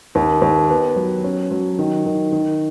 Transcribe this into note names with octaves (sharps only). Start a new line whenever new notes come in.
D#2
D#2
B3
F#3
C#4
F#3
D#3
D#3
D#3